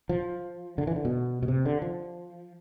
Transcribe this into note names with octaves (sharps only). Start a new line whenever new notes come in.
F3
D3
E3
D3
B2
B2
C3
D3
F3